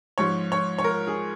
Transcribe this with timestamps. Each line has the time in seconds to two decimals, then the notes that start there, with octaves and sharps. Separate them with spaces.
0.18 G#2 F3 C#5
0.52 C#5
0.79 C#5
0.84 A#4
1.07 G#4